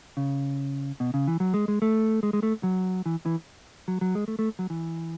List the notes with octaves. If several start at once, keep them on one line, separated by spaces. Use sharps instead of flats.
C#3
B2
C#3
E3
F#3
G#3
G#3
A3
G#3
G#3
A3
F#3
E3
E3
F#3
F#3
G#3
A3
A3
F#3
E3